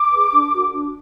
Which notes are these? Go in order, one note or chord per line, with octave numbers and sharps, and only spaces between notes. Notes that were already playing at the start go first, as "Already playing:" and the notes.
Already playing: D6
G#4 B4
D4
F#4 A#4
D4